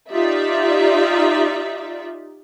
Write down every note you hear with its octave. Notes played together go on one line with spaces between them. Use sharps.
D#4 F4 G4 D5 E5